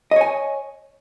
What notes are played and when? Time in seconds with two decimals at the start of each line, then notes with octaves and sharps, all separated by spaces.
0.11 D#5
0.16 C#5
0.21 G#5